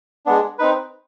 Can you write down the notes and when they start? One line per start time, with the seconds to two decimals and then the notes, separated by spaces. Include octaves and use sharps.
0.26 G#3 B3 D4
0.59 C4 D#4 B4